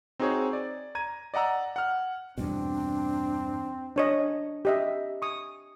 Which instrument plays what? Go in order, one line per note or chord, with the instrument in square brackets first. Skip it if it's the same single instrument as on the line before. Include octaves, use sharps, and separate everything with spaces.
[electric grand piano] C4 D#4 F#4 G#4 C5 C#5
D5
A#5 G#6 D#7
D5 D#5 F#5 A#5 E6
F#5 F6
[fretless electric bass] E2 G2 B2 [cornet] C4 [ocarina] D4
[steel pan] D4 C#5 D#5
G4 D#5 E5
C#6 D#6